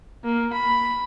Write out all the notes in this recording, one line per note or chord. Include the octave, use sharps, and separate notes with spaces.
A#3
B5